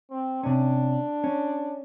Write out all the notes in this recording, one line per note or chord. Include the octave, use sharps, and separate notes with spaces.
C4
C3 C#4 D4
C#4